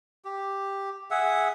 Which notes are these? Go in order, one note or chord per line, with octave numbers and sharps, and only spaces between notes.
G4
G#4 E5 F#5